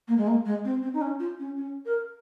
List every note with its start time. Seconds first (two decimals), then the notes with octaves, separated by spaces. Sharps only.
0.08 A#3
0.18 G#3
0.27 A#3
0.45 G#3
0.65 C4
0.82 C4
0.94 D#4
1.01 C#4
1.20 F4
1.39 C#4
1.57 C#4
1.86 A#4